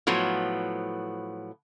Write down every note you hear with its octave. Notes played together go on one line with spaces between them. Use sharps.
A2 F3 F#3 B3